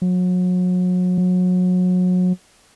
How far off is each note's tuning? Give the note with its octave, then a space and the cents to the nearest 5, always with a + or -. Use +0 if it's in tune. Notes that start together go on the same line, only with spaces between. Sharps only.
F#3 -35
F#3 -30